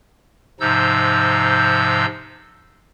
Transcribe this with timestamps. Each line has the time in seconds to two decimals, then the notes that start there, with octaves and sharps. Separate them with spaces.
0.60 G#2 C3 F3 D#4 E6 G6